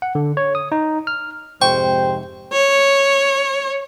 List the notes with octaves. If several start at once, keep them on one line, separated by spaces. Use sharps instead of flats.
F#5
D3
C#5
D#6
D#4
F6
F2 G#2 C3 C5 G5 C#6
C#5